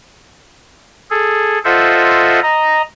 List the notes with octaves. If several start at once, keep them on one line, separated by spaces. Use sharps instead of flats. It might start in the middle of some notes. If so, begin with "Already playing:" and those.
G#4 A4
F4 A4 C5 D#5 E5 F#5
D#5 A#5